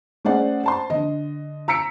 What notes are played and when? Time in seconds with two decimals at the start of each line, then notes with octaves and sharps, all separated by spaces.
0.25 A3 C#4 G#4 C5 D5 F#5
0.63 C5 A5 C6
0.90 D3 D#5
1.68 A#5 E6 B6 C#7 D7